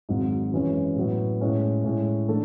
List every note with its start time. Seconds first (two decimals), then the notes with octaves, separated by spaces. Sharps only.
0.09 G#1 G#2 F#3
0.52 F#2 E3 G#3 C#4
0.96 A2 F#3 B3
1.41 A2 G#3 C#4
1.84 A2 G#3 C#4
2.28 E3 A3 D4 A4